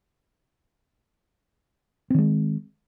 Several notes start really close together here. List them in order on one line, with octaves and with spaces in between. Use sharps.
C4 D#3 G#3